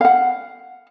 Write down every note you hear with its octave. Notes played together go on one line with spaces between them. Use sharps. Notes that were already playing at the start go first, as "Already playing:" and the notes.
F5 F#5